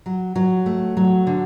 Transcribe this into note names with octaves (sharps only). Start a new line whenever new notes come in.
F#3
F#3
A3
F#3
D3